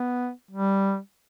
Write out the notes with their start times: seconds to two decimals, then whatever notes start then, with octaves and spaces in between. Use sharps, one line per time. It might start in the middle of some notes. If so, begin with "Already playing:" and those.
Already playing: B3
0.51 G3